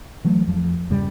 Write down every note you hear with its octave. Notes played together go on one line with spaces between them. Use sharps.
E3 F#3 A3
F2 F3
E2 G2 C#3 G3